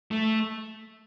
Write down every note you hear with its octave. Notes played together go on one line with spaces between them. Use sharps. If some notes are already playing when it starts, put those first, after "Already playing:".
A3